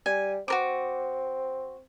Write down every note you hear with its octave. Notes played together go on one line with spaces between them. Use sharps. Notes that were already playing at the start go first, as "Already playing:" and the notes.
G3 G#5
C4 F#4 A#4 D6